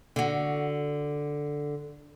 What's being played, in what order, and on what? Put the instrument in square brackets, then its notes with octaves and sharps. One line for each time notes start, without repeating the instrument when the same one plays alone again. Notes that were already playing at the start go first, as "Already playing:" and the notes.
[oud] D3 F#4